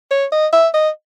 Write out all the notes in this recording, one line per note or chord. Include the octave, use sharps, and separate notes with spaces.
C#5
D#5
E5
D#5